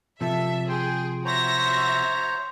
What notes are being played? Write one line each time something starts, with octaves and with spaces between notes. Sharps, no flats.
C3 F3 A4 E5
G#4 G5 C6
F#4 C5 C#5 E5 A#5 A#6